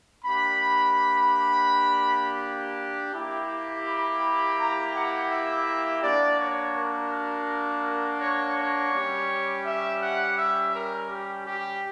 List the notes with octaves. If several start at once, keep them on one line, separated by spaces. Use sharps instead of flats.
A#3 D4 G4 B5
A#3 E4 G4
B5
A#5
F#5
E5
A#3 D4 F#4 D5
C#5
A#4
C#5
C#5
G3 C#4 G4
E5
F#5
E5
A#4
G4
G4